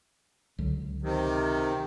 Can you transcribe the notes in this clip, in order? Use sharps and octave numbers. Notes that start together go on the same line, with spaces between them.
C#2 D3 F#3
C3 D#3